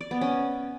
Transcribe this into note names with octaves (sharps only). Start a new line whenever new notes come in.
D5
B3
C#4